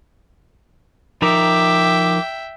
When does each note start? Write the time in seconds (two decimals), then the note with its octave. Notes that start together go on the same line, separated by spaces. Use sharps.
1.22 F3 D#4 A#4 E5 G5 D6